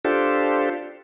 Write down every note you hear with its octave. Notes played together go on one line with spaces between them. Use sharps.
D4 F4 G4 A4 C5